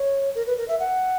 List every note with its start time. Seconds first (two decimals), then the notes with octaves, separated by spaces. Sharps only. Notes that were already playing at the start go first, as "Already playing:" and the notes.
Already playing: C#5
0.35 A#4
0.47 B4
0.57 A#4
0.68 E5
0.79 F#5